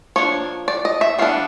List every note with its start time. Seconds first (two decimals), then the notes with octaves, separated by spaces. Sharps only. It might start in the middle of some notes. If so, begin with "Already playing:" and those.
0.16 F3 A#3 D4 C#5
0.68 D5
0.85 D#5
1.01 E5
1.19 E3 G3 B3 D4 F5